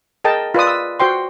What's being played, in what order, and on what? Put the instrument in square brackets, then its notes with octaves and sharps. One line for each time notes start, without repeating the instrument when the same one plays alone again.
[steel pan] G#4 A#4 D#5 G5 A5
F4 B4 D5 D#6
E6
F#4 C5 G5 C6